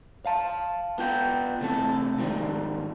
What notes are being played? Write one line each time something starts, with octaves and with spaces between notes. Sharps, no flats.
F5 A5
B3 F4 G5
C3 E3 A3 A4
G#2 D#3 F3 G3